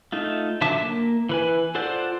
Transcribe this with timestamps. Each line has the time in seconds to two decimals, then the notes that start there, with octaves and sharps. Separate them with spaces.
0.12 A3 D#4 F4
0.61 D3 F#3 E5 A5 D6
0.81 A#3
1.29 E3 B4 G#5
1.75 F4 A4 C5 D5 F#5